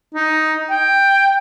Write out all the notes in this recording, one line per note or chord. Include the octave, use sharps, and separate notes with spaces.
D#4
G5